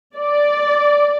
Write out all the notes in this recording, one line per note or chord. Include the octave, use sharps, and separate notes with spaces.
D5